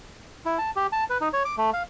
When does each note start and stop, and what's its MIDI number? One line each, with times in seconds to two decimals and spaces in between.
0.46 0.58 64
0.58 0.70 81
0.76 0.87 67
0.92 1.04 81
1.10 1.18 71
1.21 1.28 63
1.33 1.43 73
1.45 1.55 86
1.58 1.70 57
1.73 1.83 77